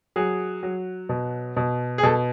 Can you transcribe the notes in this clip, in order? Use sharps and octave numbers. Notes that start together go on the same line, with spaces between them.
F#3 G#4
F#3
B2
B2
G#4
B2 A4